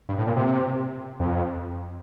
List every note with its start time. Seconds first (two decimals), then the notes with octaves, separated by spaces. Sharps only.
0.09 G2
0.18 A2
0.27 A#2
0.36 C3
1.20 F2